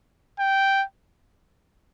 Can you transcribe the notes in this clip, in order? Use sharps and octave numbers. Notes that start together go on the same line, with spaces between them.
G5